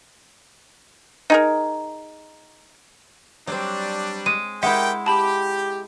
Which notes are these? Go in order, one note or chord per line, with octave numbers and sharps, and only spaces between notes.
D#4 G#4 A#4
F#3 G3 C4 D4
G#3 D#7
G#3 E4 G4 A#4 E5 F#5 G5
G4 A5 B5